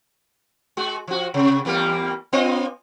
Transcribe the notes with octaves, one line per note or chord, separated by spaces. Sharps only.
G#3 F#4
F3 F#4
C3
E2 G3 A#3
B3 F4 D#5